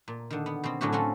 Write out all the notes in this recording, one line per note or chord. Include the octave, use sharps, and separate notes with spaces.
A#2
D3 D#3
B3
B2 C4
A2 D3 F#3 C#4 F#4 G4
C4 C#4 F4 F#4 A4